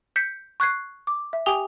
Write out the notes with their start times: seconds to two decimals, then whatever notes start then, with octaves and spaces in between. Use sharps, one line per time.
0.16 G6 B6 C#7
0.60 C#6 F#6 G#6 C7
1.07 D6
1.33 E5
1.46 G4 G5 G#5 D#6 F7 G7